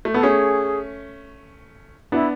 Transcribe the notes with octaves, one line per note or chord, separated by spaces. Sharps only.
A3
B3 A4
A3 C#4 G#4
B3 D4 E4